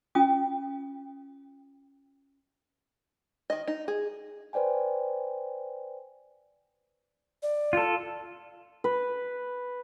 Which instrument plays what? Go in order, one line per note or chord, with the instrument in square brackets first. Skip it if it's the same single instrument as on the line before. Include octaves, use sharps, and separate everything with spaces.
[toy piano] C#4 F4 G5 D#6
[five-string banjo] D#3 D#5
D#4
G#4
[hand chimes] B4 C5 D5 G5 G#5
[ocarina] D5
[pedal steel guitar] F4 A4
[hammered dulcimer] B4